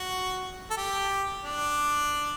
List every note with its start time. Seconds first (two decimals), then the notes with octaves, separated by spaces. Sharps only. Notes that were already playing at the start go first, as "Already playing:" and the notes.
Already playing: F#4
0.70 A4
0.77 G4
1.43 D4